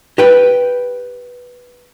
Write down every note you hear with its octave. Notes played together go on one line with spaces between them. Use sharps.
G4 B4 G5